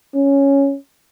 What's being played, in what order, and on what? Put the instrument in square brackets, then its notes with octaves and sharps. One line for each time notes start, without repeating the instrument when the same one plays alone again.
[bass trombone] C#4